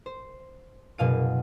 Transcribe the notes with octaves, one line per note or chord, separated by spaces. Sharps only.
C5
F#1 B2 F5 D#7